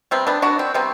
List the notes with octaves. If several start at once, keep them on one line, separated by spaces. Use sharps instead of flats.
C3 G3 B3 C4
B3 D4
D4 F#4
C4
C3 G3 B3 C4